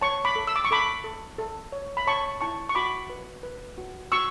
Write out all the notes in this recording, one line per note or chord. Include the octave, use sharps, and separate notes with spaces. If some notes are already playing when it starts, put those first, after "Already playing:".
C#5 A5 C#6
B5 D6
A4
E6
D6
C#6
A4 B5 D6
A4
A4
C#5
B5
C#5 A5 C#6
E4 A5 C#6
C#6
F#4 B5 D6
B4
B4
F#4
F#4 C#6 E6